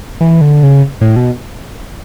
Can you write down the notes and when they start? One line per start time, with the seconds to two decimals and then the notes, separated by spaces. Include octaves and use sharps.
0.21 E3
0.41 D3
0.63 C#3
1.01 A2
1.16 B2